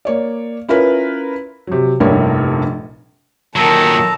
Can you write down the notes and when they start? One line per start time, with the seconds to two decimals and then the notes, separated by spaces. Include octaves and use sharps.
0.05 A#3 C#5 D5
0.69 C#4 E4 F4 A#4 B4
1.67 C3 F#3
2.00 F1 A#1 G2 E4 A#4 C#5
3.56 A#2 D#3 F#3 A4 A5 A#5